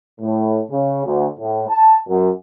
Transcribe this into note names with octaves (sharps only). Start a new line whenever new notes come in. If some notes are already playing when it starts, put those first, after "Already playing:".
A2
C#3
D2
A2
A5
F#2